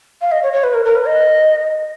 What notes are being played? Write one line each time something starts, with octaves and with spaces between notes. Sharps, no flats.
F5
D#5
C#5
C#5
B4
A#4
A#4
B4
D#5